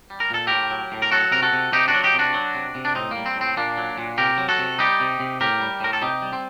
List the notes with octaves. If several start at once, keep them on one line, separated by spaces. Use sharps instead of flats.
G3
A#4
A#2 A4
A2 G4 A#4
F#3
A2
A#4
F#3 F#4 A4
C3 A#4
F#4 A4
C3
C3 D#4 G4
D4 F#4
F#3
D#4 G4
C3 D4 F#4
F#3
C3
C3
D4
A2 C4 D#4
G3 A#3
C4
A2
C4
A#2 A#3 D4
F#3
A#2
C3 G4 A#4
F#3
F#4 A4
C3
G3 D#4 G4
C3
C3
A2 G4 A#4
G3
A2 A#4
A4
C3 D#4 G4
G3
C4